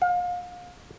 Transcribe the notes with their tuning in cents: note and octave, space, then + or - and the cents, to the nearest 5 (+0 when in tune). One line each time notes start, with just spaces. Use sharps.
F5 +35